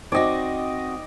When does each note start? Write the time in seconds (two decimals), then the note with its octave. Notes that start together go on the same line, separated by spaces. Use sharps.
0.12 C4 D#4 F#4 D5 D#5 G5 A#6